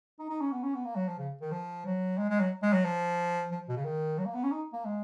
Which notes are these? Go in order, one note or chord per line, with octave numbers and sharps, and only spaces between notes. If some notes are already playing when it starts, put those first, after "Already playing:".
D#4
D#4
C#4
B3
C#4
B3
A#3
F#3
F3
C#3
D#3
F3
F#3
G#3
G#3
F#3
G#3
F#3
F3
F3
B2
C#3
D#3
F#3
A#3
B3
C#4
D#4
A#3
G#3